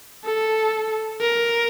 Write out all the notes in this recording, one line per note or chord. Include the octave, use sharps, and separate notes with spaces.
A4
A#4